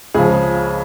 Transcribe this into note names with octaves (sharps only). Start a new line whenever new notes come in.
C#2 C#3 F3 G#4